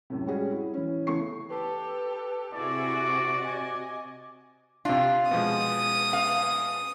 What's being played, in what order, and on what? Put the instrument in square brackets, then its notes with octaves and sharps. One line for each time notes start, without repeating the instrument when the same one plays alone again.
[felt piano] F#2 A2 C3
G3 G#3 C#4 F#4 G#4
E4
E3 C#4
C#3 E3 A3 B3 C#6 C7
[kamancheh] G4 A4 [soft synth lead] B4
[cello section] C3 F#4 [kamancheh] E4 G#4 [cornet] D5 [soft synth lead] D6
[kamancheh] D#5 G#5
[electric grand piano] C3 D4 [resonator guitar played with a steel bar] F4
[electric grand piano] B2 F3 G#3 [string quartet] D#6
[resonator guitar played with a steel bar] F5